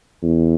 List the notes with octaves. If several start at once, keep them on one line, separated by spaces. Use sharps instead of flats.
E2